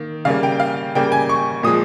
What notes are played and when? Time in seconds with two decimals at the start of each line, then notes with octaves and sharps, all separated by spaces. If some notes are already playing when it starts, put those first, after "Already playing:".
Already playing: D#3 A#3
0.25 C#3 G3 A#3 F5
0.43 G5
0.60 F5
0.95 C#3 G3 A#3 G5
1.12 G#5
1.29 C#6
1.63 A#2 F3 G#3 D#6